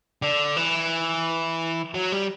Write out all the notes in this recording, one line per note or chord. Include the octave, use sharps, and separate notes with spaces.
D3
E3
F#3
G3